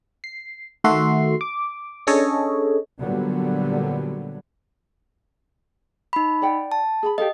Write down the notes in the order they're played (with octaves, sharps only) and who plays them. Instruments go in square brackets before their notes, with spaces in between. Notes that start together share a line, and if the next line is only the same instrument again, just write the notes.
[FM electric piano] C7
D#3 A3 F#4 E5 C6 C7
D6
C#4 D4 G#4 A4 C#5 D#5
[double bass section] A#2 D3 F#3 G3 B3
[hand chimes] D#4 B5
[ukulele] D5 F#5 G5
[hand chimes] A5
[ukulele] G#4 A#5 B5
[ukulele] G4 A4 F5 [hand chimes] D#5